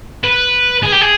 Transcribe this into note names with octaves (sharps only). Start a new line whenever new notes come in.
B4
G#4
G4
G#4